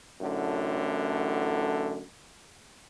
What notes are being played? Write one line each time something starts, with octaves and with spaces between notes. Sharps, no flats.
A1 F#2 A2 D3